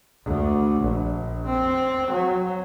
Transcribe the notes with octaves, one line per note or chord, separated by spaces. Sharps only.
D2
A#1
C4
F#3